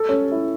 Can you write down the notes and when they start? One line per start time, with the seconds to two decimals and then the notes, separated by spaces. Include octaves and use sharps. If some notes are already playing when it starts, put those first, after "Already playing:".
Already playing: A4
0.09 C#4
0.32 E4